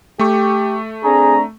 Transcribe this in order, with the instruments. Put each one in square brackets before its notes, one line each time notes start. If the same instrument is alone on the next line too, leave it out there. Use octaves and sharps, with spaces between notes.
[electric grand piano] A3 C#6 [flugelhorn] G4
[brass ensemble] C4 D4 A#5 [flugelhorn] G#4